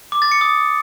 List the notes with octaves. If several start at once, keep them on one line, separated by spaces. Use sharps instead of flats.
D6
A6
C#7
D#6